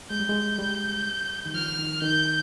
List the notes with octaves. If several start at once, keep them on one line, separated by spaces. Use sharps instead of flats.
G#3 G6
G3
G#3
G3
D#3
F3 F6
D#3
D#3 G6